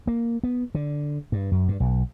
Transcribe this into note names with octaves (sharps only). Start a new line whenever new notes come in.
A#3
B3
D3
G2
F#2
G2
B1